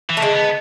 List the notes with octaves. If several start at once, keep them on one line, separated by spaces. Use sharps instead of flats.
E3
A3
D3 G#3
B3